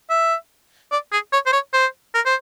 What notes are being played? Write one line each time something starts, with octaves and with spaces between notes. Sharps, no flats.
E5
D5
G#4
C#5
C5
C#5
C5
A#4
C5